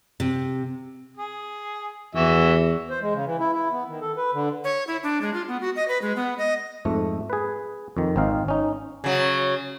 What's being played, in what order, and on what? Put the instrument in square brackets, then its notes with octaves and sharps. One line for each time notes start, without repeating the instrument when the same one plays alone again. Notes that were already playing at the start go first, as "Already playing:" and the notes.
[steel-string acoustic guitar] C3
[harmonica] G#4
[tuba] E2 [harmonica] E3 F#4 E5
[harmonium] C5
G#3
C#3
E3
E4
E4
B3
D#3
A4
B4
D3
[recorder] C#5
E4
D4
G#3
F4
B3
F#4
D#5
B4
G#3
B3
D#5
[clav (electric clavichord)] F2 G#2 A3
G#4 B4
F2 D#3
G#1 C4 D#4 F5
C#4 D#4
[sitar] C#3 F#3